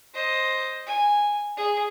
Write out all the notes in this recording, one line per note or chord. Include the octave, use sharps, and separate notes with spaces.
C5 D#5
G#5
G#4